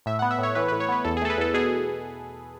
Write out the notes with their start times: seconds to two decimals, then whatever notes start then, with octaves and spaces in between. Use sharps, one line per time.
0.06 A2 E5
0.19 B3 F#5
0.31 E5
0.39 A2 C#5
0.55 E3 B4
0.68 A2 B4
0.80 C#5
0.89 B3 B4
1.04 E2 A4
1.17 G#4
1.22 A3 A4
1.30 B4
1.38 E2 A4
1.54 B2 G#4